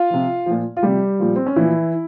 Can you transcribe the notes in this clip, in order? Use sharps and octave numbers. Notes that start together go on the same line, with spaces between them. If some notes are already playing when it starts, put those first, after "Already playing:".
Already playing: F4 F5
C3 F3
A#2 F3
F4
C3 F3 G3 G4
A#2 F3
C4
C#4
A#2 E3 F3 E4